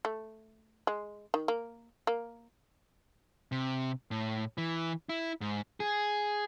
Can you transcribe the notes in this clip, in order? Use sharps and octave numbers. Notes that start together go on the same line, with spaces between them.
A3
G#3
D#3
A#3
A#3
C3
A2
E3
E4
G#2
G#4